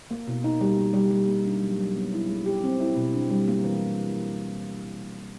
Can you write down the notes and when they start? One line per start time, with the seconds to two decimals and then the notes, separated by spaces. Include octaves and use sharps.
0.11 A#3
0.28 B2
0.44 D#4
0.61 G3
0.77 A#3
0.94 G3
1.11 G3
1.28 A#3
1.46 D4
1.62 F#3
1.79 F#3
1.95 B3
2.13 E4
2.30 G#3
2.46 G4
2.63 C4
2.80 E4
2.96 B2
3.14 D4
3.30 G3
3.48 A#3
3.64 E3